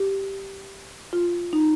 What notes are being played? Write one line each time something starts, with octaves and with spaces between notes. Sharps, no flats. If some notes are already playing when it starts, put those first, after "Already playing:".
Already playing: G4
F4
D#4